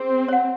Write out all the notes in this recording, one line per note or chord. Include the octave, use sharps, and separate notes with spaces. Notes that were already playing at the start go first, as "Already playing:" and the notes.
Already playing: C4 G#4
C#5 F#5